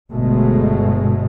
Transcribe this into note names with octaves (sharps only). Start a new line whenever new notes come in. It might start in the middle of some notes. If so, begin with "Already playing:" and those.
G1 B2 G#3 A3